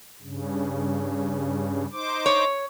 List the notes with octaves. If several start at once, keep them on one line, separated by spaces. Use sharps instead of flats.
G2 C#3
D#4 C5 D6
C#5